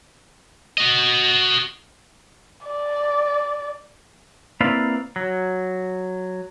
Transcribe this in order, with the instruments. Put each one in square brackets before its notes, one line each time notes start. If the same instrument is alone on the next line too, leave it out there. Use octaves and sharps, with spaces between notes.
[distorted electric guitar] F#4 D#5
[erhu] D5
[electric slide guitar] A#3 C4 E4 B4 D5 F5
F#3